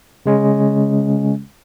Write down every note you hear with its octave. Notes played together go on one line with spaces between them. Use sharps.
C#3 G#3 C#4